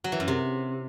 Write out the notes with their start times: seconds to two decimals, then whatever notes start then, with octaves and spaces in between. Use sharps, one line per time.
0.04 F#3
0.12 E3
0.20 F#2
0.28 C3